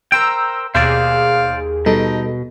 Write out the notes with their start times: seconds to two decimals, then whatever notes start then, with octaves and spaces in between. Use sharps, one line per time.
0.12 A#4 C5 G5 A#5 E6
0.75 D#2 B2 G#4 C5 D5 F5
1.86 B2 G3 D#4 A4